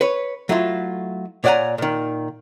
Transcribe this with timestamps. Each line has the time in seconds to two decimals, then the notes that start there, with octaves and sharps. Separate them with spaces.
0.01 B4 C#5
0.49 F#3 A3 E4 F4
1.44 A#2 C#5 D5 F#5 G#5 A#5
1.78 A#2 D#3